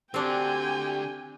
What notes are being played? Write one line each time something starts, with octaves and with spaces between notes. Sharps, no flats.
D3 C4 D4 F#4 G4 G5 G#5